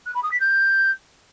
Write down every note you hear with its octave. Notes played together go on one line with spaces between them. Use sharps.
F#6
B5
D#6
B6
G6